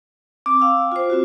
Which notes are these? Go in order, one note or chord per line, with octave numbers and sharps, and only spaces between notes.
C4 D6
F5 G5 E6
F4 C5
C4 F4 F#4